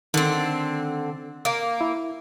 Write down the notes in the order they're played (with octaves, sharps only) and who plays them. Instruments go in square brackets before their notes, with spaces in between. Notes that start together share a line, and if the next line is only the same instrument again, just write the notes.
[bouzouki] D3 C4 [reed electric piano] D#3
[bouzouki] A#3
[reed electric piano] E4